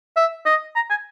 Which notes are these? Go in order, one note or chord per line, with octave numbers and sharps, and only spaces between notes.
E5
D#5
A#5
G#5